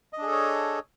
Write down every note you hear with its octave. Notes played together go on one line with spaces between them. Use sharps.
D4 G#4 A4 C#5 D#5